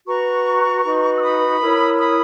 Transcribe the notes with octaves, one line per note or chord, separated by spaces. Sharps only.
F#4 B4 A#5 C#6
D#4 F#4 B4
E6
B5 D#6
E4 A#4 C#5
B5 D#6